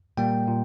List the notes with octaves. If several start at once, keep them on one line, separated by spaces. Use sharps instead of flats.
A#2 G3 A#3 G5
A#2